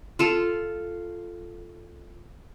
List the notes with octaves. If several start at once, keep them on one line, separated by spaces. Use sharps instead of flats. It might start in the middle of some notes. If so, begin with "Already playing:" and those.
F4 A4